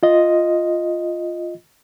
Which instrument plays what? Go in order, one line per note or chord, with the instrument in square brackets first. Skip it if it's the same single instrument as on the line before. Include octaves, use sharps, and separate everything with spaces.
[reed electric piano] F4 D#5